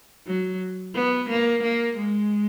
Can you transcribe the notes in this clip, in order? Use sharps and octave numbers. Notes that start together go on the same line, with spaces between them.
F#3
B3
A#3
A#3
G#3